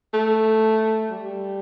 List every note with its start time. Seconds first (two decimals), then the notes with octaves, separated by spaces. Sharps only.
0.14 A3
1.11 G3